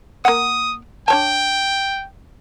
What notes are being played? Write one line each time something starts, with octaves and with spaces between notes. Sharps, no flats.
A#3 F#5 D#6
D4 C#5 G5 A5